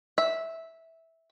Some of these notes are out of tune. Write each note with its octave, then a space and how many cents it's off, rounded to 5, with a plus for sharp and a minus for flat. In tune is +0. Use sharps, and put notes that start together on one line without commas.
E5 -10